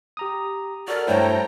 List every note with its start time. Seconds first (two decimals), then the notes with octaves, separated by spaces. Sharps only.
0.17 G4 A#5 D#6
0.88 F#4 A4 A#4 D5 F6
1.07 G2 A3 E4 C5 C#5 G5 A5 A#5